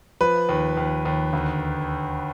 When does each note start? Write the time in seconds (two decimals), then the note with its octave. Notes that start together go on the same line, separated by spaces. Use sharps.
0.21 F3 B4
0.49 D#2
0.77 D#2
1.05 D#2
1.33 D2